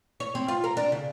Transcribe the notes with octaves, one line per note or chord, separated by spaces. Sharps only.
C#5
C4
F4
A#4
D4
C#3